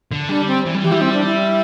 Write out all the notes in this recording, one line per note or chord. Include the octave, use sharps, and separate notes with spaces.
D3
G3 D4
C4
E3
G3
E3 G4
G3 E4
C4
D4
E4